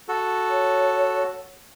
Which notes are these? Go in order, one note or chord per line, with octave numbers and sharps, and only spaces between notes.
F#4 A4
C#5